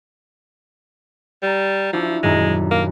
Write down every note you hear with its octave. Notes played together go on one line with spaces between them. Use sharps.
G3 A#5 A6
F3 D4 E4 F#4
D#1 F#2 G#3 A#5
A#3